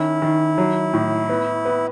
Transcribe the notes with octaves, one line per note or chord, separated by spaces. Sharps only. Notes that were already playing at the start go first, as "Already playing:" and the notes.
Already playing: D#3 C#4 E4
D#3
F#3
A2
B3
B3